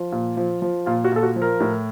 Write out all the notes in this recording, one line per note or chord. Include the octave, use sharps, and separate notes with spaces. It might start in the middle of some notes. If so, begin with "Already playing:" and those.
Already playing: F3
A#2
F3
F3
A#2 F4
F#4
A#2 A4
F#4
F3
A#4
A2